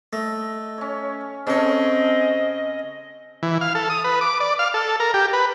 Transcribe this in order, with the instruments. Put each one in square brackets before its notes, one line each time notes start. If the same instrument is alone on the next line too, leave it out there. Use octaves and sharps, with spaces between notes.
[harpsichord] A3 [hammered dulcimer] D#5
[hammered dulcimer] C#4 C#5
[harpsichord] C#3 C#6 [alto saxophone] C4 [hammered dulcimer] C#4 A4 C#5 [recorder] D#5
[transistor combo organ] E3
F5
A4
D#6
B4
D6
D5
F5
A4
A#4
G4
B4